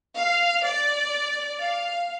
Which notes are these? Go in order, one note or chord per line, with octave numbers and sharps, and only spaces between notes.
F5
D5
F5